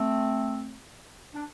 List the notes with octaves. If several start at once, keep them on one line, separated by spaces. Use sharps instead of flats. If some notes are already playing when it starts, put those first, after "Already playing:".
Already playing: A3 C4
D4